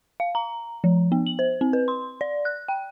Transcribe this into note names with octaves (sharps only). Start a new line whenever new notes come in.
F5
A#5
F3
B3
F#7
C5
C4
B4
C6
D5
F#6
G5